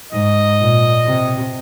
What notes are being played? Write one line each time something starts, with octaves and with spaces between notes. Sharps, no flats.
G#2 D#5
A#2
C3